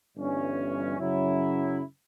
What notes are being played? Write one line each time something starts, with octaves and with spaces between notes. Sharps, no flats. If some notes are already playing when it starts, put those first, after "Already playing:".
G1 G2 E3 G3 C#4
F#2 C#3 F#3 C#4 E4